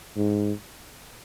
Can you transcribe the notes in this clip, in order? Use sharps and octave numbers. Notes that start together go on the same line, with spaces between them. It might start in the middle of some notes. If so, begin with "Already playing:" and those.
G#2